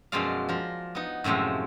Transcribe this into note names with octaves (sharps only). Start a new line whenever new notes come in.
F#2 B2 F3 G#3 D5 F5
F3 A#4
B3 D#4
F#2 A2 C3 F3 G#3